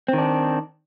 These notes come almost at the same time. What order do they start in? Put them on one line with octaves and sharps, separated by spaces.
C4 D#3 D4